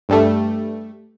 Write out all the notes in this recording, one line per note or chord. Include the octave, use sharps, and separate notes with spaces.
G2 G3 A3